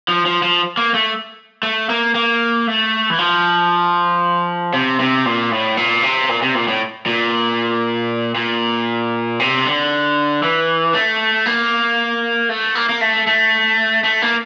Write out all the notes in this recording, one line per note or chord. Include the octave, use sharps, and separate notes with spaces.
F3
F3
F3
A#3
A3
A3
A#3
A#3
A3
E3
F3
C3
C3
A#2
A2
A#2
C3
A#2
C3
A#2
A2
A#2
A#2
C3
D3
E3
A3
A#3
A3
A#3
A#3
A3
A3
A3
A#3